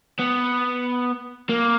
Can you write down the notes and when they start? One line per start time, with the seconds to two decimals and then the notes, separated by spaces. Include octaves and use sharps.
0.19 B3
1.49 A#3